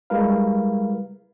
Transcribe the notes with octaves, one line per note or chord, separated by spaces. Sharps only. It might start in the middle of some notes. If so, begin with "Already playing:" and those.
G3 G#3 E4 A#4 B4 F5